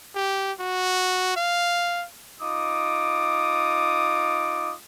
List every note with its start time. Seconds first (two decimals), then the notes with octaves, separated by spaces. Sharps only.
0.15 G4
0.60 F#4
1.36 F5
2.41 D#4 F4 D6 D#6